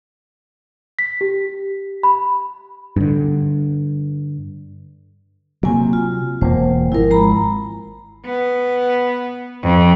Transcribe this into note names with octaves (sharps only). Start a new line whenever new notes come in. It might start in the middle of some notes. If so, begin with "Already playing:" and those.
B6
G4
B5
G2 D3
C3 F#3 A#3 G#5
F4
E1 A#3 C5
G#1 F3 E4 A#4
G#3 A#5 B5
B3
F2